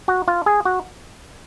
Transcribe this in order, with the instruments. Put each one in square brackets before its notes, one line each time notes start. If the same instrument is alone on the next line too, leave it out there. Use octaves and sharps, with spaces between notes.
[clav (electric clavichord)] F#4
F4
G#4
F#4